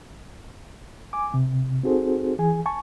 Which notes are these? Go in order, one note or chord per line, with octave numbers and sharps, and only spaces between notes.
G#5 D6
C3
C4 D#4 F#4 G#4 A4 C5
E3 G#4 G#5
G#5 A5 C#6